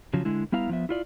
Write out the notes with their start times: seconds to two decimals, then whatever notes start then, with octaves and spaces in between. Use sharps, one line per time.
0.13 C#3 F3 F#3
0.25 D3 G#3 E4
0.52 G3 B3 E4 F5 A#5
0.69 F3 B3 E5
0.89 E4 F4 D5